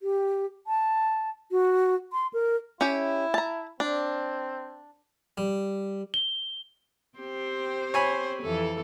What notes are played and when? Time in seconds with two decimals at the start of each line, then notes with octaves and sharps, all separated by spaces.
0.01 G4
0.67 A5
1.51 F#4
2.13 C6
2.33 A#4
2.81 C#4 E4 G4
3.34 A5 A#5
3.80 C4 D4
5.37 G3
6.14 G7
7.19 C4 G4 C5
7.94 C#5 G#5 B5
8.42 F2 E3 A4